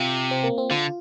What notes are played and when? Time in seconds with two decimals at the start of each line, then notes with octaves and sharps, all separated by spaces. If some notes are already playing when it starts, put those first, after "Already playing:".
Already playing: C3 F4
0.31 C4
0.43 A#3
0.58 C4
0.70 D3 F4